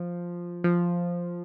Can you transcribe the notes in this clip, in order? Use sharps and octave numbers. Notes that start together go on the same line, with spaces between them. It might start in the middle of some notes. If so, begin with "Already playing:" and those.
Already playing: F3
F3